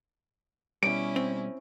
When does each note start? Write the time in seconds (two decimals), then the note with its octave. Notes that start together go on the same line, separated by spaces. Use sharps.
0.83 B2 G3 C#4 E4 D7
1.16 C4